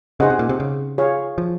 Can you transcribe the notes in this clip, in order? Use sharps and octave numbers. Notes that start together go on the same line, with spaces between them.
C#3 D#4 G#4 C5 D#5 F#5
C3
A#2
C3
C#3
F4 G#4 C#5 F5
F3